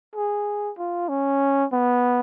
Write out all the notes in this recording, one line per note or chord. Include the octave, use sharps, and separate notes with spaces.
G#4
F4
C#4
B3